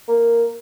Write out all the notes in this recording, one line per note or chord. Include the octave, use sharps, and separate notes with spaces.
A#3